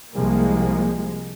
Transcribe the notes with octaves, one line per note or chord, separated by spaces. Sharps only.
C2 F3 G#3 A#3